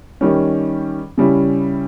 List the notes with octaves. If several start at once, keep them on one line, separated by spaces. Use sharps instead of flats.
D#3 G3 C#4
C#3 G3 C#4 E4